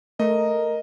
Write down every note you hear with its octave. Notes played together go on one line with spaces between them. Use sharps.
A3 A#4 D#5